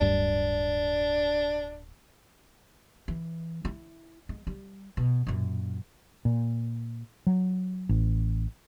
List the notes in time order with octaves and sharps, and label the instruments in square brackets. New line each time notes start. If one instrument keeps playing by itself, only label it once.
[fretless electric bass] D1 G2 [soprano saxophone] D4
[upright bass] E3
E4
G#3
G3
B2
F#2 A#2
[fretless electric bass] A#2
F#3
A1